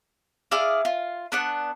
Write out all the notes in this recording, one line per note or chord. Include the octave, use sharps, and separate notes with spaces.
E4 G#4 D5 F5
F4
B3 D4 F#5